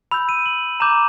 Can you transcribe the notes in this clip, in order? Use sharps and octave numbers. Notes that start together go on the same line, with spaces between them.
B5 E6 G6 F7
D#7
F#7
A#5 D6 G6 E7